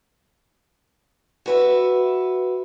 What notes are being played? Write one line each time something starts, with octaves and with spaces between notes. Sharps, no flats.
F#4 B4 E5